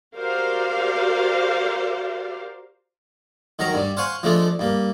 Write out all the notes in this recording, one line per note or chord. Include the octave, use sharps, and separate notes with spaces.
F#4 G4 A#4 C5 D5 F5
D#3 F#3 A#4 A#5
G2 G3
C5 F5 F#5 G#5 C6 C#6
F3 G#3 A3 D4
G2 A#3